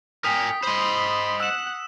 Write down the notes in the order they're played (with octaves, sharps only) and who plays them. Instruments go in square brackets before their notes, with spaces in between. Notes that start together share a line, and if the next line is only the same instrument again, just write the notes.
[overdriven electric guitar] A#4 G#5 [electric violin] G5 [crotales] D#6 B6
[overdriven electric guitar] C5 D#5 [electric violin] B5 C6
[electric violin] F#5 F#6 [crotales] E6 E7